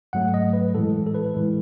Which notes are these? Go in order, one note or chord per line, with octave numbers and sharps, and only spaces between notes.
G#2 F#3 A3 F#5
D#5
B4
A2 E3 G#3 A4
A4
B4
A2 E3 G#3